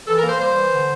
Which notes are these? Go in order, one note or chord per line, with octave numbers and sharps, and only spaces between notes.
E3 A4
A#4
A#3 C5
G3 C5
E3
D3